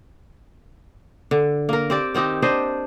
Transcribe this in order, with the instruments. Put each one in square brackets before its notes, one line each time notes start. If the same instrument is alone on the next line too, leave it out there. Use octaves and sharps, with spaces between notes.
[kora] D3
A#3 A#4
C4 G4 D5
D#3 C4 D#4 G4
D4 C5 D#5 G5